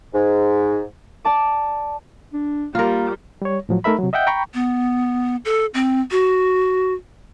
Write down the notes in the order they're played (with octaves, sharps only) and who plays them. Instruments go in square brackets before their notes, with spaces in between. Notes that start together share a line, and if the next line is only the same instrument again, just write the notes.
[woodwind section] G#2
[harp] D5 A5 D6
[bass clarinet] D4
[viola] G3 [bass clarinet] A#3 [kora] F4 A#4
[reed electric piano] G3 C#5
A2 F3 F#3
A3 D#4 A#4 E5 B5
C3 F#3
D#5 E5 F#5 G5 G6
G5 A#5 B5 C#6
[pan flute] B3
A4
C4
F#4